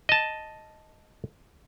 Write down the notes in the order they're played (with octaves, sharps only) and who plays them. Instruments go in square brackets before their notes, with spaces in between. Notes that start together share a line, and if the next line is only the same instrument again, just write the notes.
[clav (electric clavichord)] D#5 A5